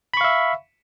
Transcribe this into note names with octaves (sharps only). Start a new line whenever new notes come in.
E5 F5 B5 C#6